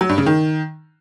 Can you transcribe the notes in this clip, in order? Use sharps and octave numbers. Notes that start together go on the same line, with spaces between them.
F#3
G2
C#3
D#3